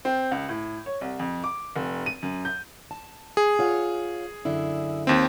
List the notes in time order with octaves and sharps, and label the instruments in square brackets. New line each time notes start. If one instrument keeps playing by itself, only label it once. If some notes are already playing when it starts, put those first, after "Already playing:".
[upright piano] C4
C#2
A2
C#5
C2
F2
D6
F1
D#7
F#2
G6
[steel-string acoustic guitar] A5
[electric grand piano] G#4
[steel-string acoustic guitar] F4 C#5 F#5
F#2 D3 E4
[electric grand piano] D#2 C4